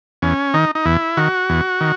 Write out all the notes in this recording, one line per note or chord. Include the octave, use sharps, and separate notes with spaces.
E2 C#4
D#3 D#4
D#4
E2 E4
D#3 F#4
E2
D#3